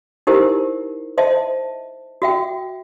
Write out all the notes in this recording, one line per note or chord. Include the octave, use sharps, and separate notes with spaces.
D#4 E4 G4 A#4 C5
C5 D#5 E5 A5
F#4 E5 G5